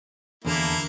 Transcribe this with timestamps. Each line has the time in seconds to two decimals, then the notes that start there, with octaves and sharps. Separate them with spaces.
0.44 E2 D3 A#3 E4 A5